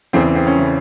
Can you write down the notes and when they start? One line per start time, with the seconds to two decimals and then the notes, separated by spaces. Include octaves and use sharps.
0.13 E2 C#3 E3 C4
0.35 C4
0.47 C#4
0.59 C#3 E3